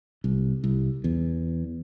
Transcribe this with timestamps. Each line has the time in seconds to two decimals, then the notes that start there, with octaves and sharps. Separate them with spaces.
0.24 C2
0.64 C2
1.04 E2